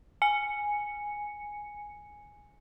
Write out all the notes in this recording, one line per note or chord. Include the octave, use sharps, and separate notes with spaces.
G#5 C#7